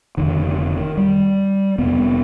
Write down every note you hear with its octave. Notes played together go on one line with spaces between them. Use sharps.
F1 F2 D3 D#3
G3
F1 F2 C3 B3